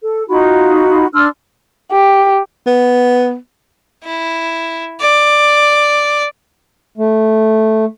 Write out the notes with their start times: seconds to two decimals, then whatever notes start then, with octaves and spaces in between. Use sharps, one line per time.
0.03 A4
0.29 D#4 F4 F#4 B5
1.13 D4 C6 E6 F6
1.92 G4
2.67 B3
4.04 E4
5.00 D5
6.98 A3